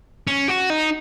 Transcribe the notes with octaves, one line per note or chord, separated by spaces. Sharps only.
C#4
F#4
D#4